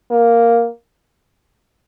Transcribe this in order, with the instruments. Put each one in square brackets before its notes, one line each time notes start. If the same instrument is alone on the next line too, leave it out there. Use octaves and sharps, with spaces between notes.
[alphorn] A#3